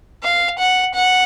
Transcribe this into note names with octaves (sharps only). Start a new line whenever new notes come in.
F5
F#5
F#5